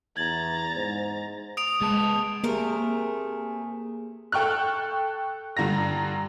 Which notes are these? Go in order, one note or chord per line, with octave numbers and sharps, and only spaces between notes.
E2 A#5 G#6 A6 F#7
G#2 C5
D#6 D7 F7
G#3 B3 A5
C3 A3 A#3 G#4 A#4
A4 G5 C#6 F6 F#6
G2 D3 A#5 A#6